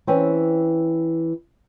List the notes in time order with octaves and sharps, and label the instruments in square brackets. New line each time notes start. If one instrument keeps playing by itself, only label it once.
[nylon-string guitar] E3 C4 C#4